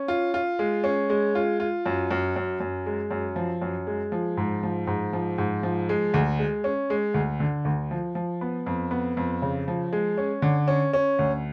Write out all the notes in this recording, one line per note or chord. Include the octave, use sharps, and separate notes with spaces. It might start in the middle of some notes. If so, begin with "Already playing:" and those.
Already playing: C#4
F4
F4
G#3
C#4
G#3
F4
F4
F#2
F#2
F#2
F#2
G#3
F#2
F3
F#2
G#3
F3
G#2
F3
G#2
F3
G#2
F3
G#3
D2
G#3
C#4
G#3
D2
D3
D2
F3
F3
B3
F2
B3
F2
C#3
F3
G#3
C#4
D3
C#4
C#4
D2